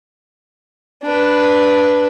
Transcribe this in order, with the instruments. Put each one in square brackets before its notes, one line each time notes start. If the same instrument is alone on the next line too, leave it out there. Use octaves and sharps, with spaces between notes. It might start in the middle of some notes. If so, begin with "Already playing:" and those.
[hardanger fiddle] D4 B4